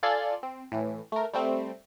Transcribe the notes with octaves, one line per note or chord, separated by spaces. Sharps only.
F4 A4 D5 G#5 C6
C4
A2 E3
A3 A#4
G3 A3 C4